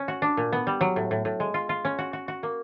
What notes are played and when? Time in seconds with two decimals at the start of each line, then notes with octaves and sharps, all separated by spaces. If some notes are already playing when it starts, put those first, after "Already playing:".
Already playing: C#4
0.08 F#4
0.22 D4
0.37 A#2
0.52 B3
0.67 G3
0.81 F#3
0.96 A2
1.11 A2
1.25 A2
1.40 G#3
1.54 F4
1.69 F4
1.85 C#4
1.99 F#4
2.13 F#4
2.28 F#4
2.43 A#3